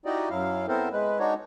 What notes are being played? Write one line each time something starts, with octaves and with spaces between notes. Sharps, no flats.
D#4 E4 F#4 G4 D5 D#5
F#2 F#3 E4 F5
B3 C4 E4 A4 A#4 C5
G#3 B4
G#3 D4 D#4 F#4 C#5